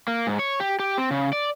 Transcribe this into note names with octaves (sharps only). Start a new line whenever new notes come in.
A#3
G#2
C#5
G4
G4
C4
C#3
D5